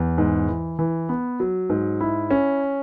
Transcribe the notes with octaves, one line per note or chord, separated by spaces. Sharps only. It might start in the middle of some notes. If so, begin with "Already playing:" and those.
Already playing: E2
G#2
E3
E3
B3
F#3
G#2
E4
C#4